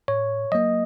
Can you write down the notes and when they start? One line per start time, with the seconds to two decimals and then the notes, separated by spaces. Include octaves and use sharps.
0.08 A2 C#5
0.52 F#3 A#3 D#5